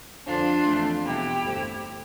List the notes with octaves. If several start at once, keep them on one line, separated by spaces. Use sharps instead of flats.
F2 D3 F3 C4 D4 F4
F2 E3 A3
E2 B2 G3 B3 E4 G4
G2 D3 A3 C4